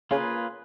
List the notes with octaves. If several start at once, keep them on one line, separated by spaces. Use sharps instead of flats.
C#3 A#3 F4 G#4 B4